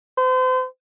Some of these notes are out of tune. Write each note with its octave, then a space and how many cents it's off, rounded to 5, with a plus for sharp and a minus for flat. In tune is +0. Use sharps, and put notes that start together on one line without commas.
C5 -35